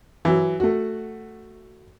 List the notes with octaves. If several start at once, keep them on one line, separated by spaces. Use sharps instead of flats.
E3 F#3
A3 F#4